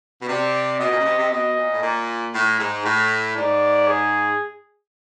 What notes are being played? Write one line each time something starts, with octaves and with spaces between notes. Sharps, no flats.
B2
C3 D5
B2 D#5
A#2
C#3
C3
C3
B2 D#5
A#2
A2
A#2
A2
G#2
A2
G#2 D5
G#4